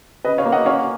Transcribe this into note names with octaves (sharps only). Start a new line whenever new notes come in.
C#3 B4 D#5
C#5 F5
A#3
D#5 F#5
C#4 C#5 F5